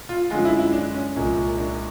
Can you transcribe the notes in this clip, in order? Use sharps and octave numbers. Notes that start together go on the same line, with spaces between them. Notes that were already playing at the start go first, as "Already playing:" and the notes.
F4
F#2 D3 F3 G#3 F4
E4
E4
D4
C#4
C2 A#2 F3 G#3
D4